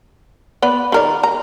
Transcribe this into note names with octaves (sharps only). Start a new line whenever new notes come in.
B3 B4 D5
D#3 A#4 D5
A#5